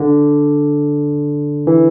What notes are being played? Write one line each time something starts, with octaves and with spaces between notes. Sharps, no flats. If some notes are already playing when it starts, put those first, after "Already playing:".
Already playing: D3
E3